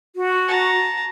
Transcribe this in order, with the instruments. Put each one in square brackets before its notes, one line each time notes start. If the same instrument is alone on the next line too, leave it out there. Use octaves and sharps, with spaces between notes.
[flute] F#4
[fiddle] A5 A#5